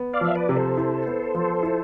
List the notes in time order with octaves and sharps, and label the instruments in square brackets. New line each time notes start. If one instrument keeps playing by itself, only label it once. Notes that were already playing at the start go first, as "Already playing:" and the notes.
Already playing: [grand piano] B3
[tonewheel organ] D5 F5
[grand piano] F3 [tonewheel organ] E5
[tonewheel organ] B4 D5
[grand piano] C3
[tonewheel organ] A4 C5
[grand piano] E4
B3
F3
E4